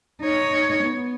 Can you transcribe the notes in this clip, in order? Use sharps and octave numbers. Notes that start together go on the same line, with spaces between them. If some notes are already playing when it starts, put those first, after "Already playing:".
D#4 C#5
B3